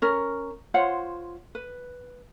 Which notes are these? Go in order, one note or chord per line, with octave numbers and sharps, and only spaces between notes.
C#4 A#4
F4 C5 C#5 F#5
B4